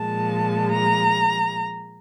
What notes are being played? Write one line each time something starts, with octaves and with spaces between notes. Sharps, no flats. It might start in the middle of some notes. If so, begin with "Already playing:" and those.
Already playing: A#2 F3 G#3 A5
A#5